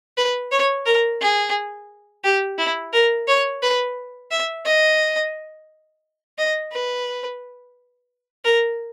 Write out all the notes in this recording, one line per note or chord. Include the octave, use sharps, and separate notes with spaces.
B4
C#5
A#4
G#4
G4
E4
A#4
C#5
B4
E5
D#5
D#5
B4
A#4